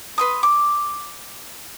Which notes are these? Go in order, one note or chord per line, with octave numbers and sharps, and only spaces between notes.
B4 C6 D#6
D6